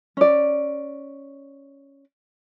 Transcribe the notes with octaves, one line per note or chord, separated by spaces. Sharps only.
C#4 D5